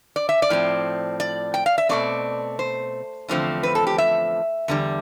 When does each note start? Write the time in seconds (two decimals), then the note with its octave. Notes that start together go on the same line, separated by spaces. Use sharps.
0.16 D5
0.29 E5
0.42 D5
0.50 A2 F3 C4
1.20 D5
1.54 G5
1.66 F5
1.78 E5
1.89 B2 A3 C4 D5
2.59 C5
3.28 E2 D3 F3 A3 C4
3.63 B4
3.75 A4
3.87 G4
3.98 E5
4.68 E2 D3 G3